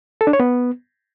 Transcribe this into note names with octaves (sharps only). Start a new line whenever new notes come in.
A4
D4
C#5
B3